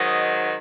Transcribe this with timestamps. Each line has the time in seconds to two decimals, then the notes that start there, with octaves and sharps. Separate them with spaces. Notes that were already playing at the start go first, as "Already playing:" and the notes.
Already playing: G#2 D#3 F#3 D#5